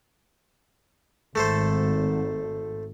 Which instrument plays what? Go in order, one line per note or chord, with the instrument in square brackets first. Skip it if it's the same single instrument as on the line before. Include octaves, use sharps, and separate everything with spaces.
[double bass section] G#1 [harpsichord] A3 A4 C5